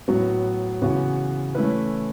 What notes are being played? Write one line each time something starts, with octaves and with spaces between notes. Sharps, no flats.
A2 F#3 B3 F#4
C#3 E3 B3 F#4
E3 A3 C#4 E4 B4